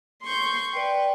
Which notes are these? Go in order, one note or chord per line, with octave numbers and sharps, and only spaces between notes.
C6 C#6 G6
B4 D5 G5